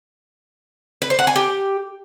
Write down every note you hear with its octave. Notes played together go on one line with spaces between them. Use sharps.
B4
C5
F#5
G#5
G4